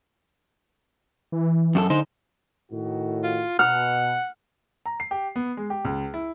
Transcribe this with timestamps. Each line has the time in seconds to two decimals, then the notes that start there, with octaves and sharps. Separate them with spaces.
1.32 E3
1.75 F#2 F#4 A4
1.90 D3 D#4 C5
2.71 A2 D#3 F#4
3.24 F4
3.59 B2 F#5 F6
4.86 A#5
5.00 C7
5.11 G4
5.36 B3
5.57 G#3
5.70 G4
5.85 C#2
6.14 E4